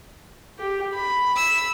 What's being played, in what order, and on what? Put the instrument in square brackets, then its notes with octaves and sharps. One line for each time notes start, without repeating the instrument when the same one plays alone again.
[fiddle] G4
B5
[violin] E6